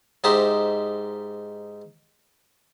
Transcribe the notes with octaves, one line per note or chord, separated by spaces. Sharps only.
G#2 D#4 G4 C5 E5